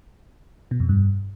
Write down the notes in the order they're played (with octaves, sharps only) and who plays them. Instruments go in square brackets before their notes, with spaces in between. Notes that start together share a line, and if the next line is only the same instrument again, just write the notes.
[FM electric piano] B2
F2
G2